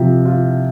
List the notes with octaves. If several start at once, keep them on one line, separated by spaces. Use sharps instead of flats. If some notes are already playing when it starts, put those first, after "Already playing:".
Already playing: C3 F3
F4